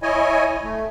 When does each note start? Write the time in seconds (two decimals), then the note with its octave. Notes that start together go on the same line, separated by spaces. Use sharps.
0.02 E4 C#5 D#5 G#5
0.64 A3